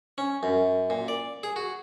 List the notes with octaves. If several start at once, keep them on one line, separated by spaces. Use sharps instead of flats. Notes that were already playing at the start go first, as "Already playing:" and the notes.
C#4
F#2
A#2
D5
G#4
F#4